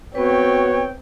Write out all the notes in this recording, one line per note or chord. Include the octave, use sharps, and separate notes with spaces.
B3 C4 F#4 B4 C#5 G5